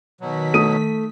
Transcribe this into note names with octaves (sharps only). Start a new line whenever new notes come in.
B2 D#3 F#3 B6
A3 D#6 D#7